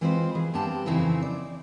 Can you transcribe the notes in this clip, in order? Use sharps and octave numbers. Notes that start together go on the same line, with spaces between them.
E3 G#3 C4 F4 B4 C5
E3 G#4
G2 B3 C4 G4 A5
F2 C#3 E3 C4 D#4 E4
D5